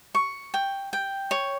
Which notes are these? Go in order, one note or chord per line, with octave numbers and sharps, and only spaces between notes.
C#6
G5
G5
C#5